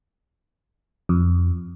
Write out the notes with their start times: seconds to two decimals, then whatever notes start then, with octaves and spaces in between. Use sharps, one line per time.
1.09 F2